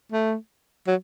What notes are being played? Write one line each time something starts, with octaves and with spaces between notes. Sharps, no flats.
A3
F#3